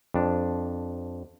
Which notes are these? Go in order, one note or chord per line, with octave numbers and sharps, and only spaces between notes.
F2 D4